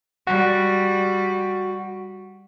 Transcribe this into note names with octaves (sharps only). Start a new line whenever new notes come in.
G3 F#4